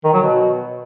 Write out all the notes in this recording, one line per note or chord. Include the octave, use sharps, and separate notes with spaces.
D#3
F#3
B2